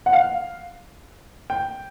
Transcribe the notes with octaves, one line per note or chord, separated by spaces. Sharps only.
F#5
F5
G5